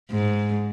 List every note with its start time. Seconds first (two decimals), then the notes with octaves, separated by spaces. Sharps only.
0.11 G#2